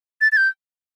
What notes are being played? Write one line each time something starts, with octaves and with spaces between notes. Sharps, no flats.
A6
A6
G6